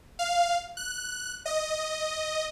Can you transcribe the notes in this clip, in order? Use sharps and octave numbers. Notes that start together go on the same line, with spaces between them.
F5
F#6
D#5